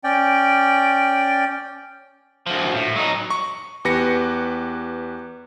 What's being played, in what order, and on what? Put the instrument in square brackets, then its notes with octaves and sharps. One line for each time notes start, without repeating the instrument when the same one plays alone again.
[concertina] C#4 D5 G5
[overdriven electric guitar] D2 F3
A2
F#3 D#4
[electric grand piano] C#6
E2 G4 B4 A#6 C#7